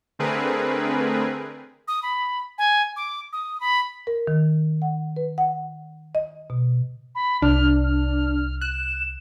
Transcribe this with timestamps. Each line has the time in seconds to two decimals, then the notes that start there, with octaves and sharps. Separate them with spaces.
0.19 D3 A3 C4 G#4 A#4 B4
1.88 D#6
2.03 B5
2.58 G#5
2.96 D6
3.33 D#6
3.60 B5
4.07 A#4
4.27 D#3
4.82 F#5
5.17 B4
5.38 F#5
6.15 D#5
6.50 B2
7.15 B5
7.42 C2 D4 F6
7.84 F6
8.61 F#6 E7